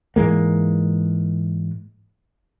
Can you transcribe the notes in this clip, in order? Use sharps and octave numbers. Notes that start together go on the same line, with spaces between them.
G#2 E3 G#3 A#3